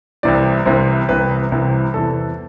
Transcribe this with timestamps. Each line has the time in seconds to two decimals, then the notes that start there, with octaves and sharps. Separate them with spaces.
0.23 C2 C3 E3 D5
0.66 C2 C3 E3 C5
1.09 C2 C3 E3 B4
1.52 C2 C3 E3
1.94 E2 C3 E3 A4